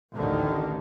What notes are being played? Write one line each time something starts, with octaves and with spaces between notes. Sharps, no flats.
A1 D2 D3 D#3